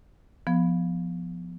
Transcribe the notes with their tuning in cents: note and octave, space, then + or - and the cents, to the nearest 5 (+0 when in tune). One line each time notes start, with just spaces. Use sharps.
F3 +0 B3 +0